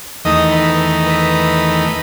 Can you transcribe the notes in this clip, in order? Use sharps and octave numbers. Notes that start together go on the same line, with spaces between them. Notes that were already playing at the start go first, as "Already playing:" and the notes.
E2 D#3 A3 D#4 D#5
B4
B4